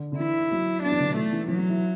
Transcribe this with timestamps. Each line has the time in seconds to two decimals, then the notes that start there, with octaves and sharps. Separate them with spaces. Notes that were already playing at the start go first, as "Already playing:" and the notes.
Already playing: D3
0.12 D3
0.19 E3 E4
0.51 F#3
0.83 B3 D4
0.91 E3
1.00 D3
1.08 B2
1.16 E3 A3
1.33 E3
1.48 E3 F#3
1.59 E3
1.70 E4